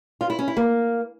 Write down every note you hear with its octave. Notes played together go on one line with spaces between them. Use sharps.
F4
E4
C#4
E4
A#3